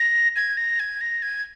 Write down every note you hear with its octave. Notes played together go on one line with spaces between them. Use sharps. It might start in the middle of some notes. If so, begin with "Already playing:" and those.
Already playing: A#6
G#6
A#6
G#6
A#6
G#6